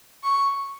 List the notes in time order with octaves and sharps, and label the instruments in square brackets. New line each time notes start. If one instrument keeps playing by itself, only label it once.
[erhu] C#6